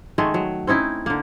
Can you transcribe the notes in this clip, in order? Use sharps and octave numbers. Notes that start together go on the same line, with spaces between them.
D#3 G#3 A3
F#3
C4 C#4 D#4 E4
D3 A#3